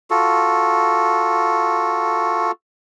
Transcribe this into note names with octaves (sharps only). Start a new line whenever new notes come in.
F4 F#4 A4